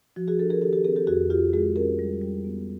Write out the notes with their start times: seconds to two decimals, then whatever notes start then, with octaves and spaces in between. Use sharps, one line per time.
0.16 F3 F#4
0.28 F#4 G#4
0.39 D4 G4 A4
0.50 G#4 A#4
0.62 D#3 G4 A4
0.73 G4 A4
0.84 C4 G#4 A#4
0.96 G4 A4
1.07 F2 F#4 G#4
1.30 F2 F4 G4
1.53 G#3 F#4 G#4
1.76 C#4 G#4 A#4
1.99 G3
2.22 G3
2.45 B3